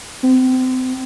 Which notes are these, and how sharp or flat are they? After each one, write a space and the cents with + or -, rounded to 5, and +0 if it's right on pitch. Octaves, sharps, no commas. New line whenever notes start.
C4 -30